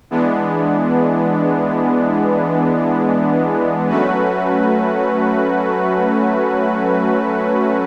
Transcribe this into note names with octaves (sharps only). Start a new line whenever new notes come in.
E3 G#3 B3 D4
F#3 A3 C#4 F#4 B4